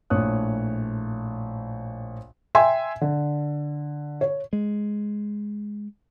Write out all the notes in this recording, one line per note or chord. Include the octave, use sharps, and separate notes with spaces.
A#1 A2 C#5 D#6 F#6
E5 G5 G#5 C6
D3
C#5
G#3